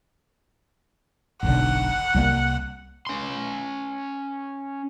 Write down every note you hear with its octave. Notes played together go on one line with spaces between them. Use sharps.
F#1 B1 D3 F#5
C2 G3 A#3
C#4 C6